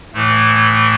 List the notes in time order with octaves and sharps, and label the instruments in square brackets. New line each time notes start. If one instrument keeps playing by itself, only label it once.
[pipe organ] A2 E3 A3